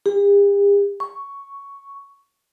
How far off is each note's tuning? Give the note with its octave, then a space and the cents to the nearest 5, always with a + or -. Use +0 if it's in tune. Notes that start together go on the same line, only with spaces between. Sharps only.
G4 +45
C#6 +5